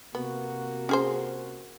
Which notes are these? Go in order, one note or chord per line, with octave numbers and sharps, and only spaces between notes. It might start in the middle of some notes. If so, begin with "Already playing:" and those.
C3 A#3 B3 F#4
C#4 G#4 C5